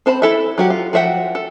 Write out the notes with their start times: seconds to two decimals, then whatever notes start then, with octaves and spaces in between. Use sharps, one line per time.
0.06 C4 C5 A5 B5
0.22 E4 A4 E5
0.58 F#3 F#4 G4
0.70 F4
0.93 F3 F#4 E5 F#5 G5
1.35 A4